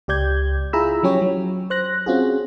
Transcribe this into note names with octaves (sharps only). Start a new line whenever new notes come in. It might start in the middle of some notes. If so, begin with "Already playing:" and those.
C#2 G4 D5 G6 G#6
E4 F4 G#4 A#5 B5 E6
F3 F#3 C#4 G4 C#5
F#3
C5 F#6 A#6
C4 C#4 F4 F#4 G#4